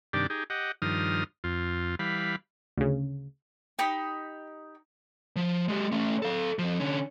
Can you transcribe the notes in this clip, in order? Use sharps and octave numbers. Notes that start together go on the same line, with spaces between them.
G2 C3 D#3 D4 G4 D5
D#4 G4 G#4
G4 D#5 F#5
G2 D#3 F3 D#6 F6
F2 F4
E3 G3 F5 B5
D2 C#3
D#4 G4 G5 B5
F3
G#3 G4
A3 C#4
A4 F5
F2 F3
D3 C#4